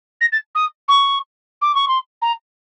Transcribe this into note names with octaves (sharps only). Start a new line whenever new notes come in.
A#6
A6
D#6
C#6
D6
C#6
C6
A#5